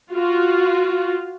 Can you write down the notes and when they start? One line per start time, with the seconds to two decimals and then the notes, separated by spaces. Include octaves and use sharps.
0.13 F4 F#4